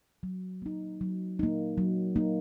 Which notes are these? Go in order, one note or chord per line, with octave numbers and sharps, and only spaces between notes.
F#3
A#3 D#4
F#3
A#3 D#4
F#3
A#3 D#4